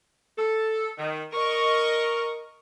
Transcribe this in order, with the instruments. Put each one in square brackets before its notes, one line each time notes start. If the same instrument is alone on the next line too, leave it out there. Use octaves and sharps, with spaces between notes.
[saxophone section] A4
D#3
[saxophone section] A#4 [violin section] D#5 C#6